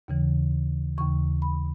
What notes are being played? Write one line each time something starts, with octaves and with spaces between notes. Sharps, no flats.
D#2 C#3 E3
D#2 C#3 E3 C#6
B5